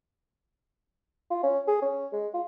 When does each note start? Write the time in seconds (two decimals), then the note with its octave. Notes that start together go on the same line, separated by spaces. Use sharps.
1.30 F4
1.43 C#4
1.67 G#4
1.82 C#4
2.13 G#3
2.34 F4